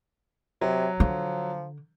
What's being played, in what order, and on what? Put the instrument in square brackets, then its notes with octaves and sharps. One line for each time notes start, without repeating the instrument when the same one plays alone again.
[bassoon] C3 [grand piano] F#3
[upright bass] D3 [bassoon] F3